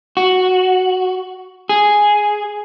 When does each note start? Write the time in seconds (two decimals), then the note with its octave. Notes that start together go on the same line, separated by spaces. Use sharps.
0.17 F#4
1.69 G#4